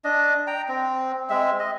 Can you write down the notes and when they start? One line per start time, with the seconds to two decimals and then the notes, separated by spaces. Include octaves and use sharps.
0.04 D4 D#5
0.47 G5 A#5
0.69 C4
1.30 G#3 C4 E5
1.59 D#5